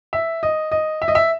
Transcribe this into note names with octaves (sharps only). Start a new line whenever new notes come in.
E5
D#5
D#5
E5
D#5
E5